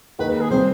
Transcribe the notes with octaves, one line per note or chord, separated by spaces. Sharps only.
D#2 D#3 G#3 B4
B4
G#4
C3 G3 C4 C5